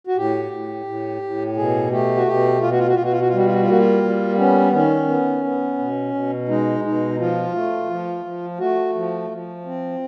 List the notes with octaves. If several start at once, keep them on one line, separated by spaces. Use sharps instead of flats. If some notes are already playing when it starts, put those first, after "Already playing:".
F#4
A2 G4
A2
A2
A2
B2 G#4
A3 G4
F#4
B2 G4
B2 F4
F#4
F4
F#4
B2 F4
F#4
F4
F#4
F4
G3 F#4
F4
F#4
F4
A#3 F#4
F4
G3
B3 C#4
D#3 C#4
B3
B3
B2
B2
G#3 D#4
B2 D#4
F3 F4
A3
F3
F3
A3 F#4
F3
F3
C4